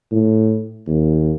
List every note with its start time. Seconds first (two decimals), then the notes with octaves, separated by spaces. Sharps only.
0.12 A2
0.87 D#2